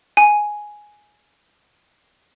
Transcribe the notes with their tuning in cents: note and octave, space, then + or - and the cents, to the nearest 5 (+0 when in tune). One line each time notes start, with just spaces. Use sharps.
G#5 +5